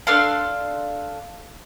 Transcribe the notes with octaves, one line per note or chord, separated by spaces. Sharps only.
D4 A4 F5 C6